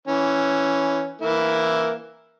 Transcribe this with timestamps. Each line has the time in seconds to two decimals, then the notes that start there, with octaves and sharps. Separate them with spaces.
0.07 E3 C#4
1.22 E3 A#3 E4